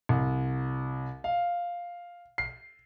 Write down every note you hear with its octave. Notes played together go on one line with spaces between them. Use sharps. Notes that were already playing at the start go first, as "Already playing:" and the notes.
C2
F5
C7